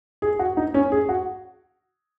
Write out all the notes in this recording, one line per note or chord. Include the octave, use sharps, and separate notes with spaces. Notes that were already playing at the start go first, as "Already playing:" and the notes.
G#4
F#4
D#4
C#4
G#4
F#4